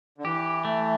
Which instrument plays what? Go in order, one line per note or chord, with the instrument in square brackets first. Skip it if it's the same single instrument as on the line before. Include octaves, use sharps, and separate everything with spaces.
[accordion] D3
[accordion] E3 [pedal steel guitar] G4
[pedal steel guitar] A3